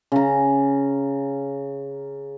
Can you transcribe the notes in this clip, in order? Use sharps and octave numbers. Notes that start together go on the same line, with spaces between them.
C#3 A#5